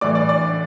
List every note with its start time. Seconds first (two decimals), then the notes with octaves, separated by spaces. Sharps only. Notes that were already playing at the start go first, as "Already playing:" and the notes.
0.01 A2 E3 D5 D6
0.15 D5 D6
0.29 D5 D6